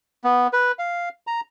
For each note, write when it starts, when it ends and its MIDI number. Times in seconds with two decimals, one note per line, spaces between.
0.24 0.47 59
0.53 0.72 71
0.79 1.09 77
1.27 1.41 82